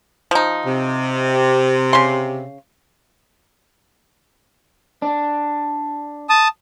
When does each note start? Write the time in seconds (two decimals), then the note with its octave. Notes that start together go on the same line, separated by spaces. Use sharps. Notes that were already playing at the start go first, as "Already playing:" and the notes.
0.31 F3 D#4
0.66 C3
1.93 C#3 C6
5.02 D4
6.29 A5 D#6